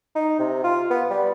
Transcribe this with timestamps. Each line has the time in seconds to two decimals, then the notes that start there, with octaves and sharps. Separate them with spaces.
0.15 D#4
0.39 C3
0.64 F4
0.90 B3
1.10 G3